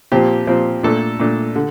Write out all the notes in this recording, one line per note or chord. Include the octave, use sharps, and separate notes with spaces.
A#2 F3 C4 G4
A#2 F3 C4
A#2 A3 D4 A4
A#2 A3 D4
D3